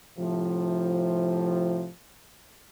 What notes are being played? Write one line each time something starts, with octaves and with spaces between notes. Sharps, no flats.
A2 C3 F3